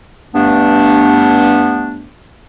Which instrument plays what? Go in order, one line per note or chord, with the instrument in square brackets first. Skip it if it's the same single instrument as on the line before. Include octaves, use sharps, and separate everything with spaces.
[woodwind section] G2 A3 B3 D4